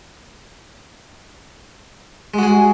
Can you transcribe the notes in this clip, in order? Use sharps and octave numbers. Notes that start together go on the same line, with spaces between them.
G#3 F#4 G#4